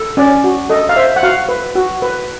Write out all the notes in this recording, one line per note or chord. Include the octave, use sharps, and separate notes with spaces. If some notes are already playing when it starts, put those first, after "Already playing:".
Already playing: A4
C#4 D5
F#4
A4 D#5
F5
C5 E5
F#5
F#4 F5
B4
F#4
B4